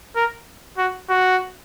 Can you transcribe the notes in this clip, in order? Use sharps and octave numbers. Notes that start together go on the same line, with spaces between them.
A#4
F#4
F#4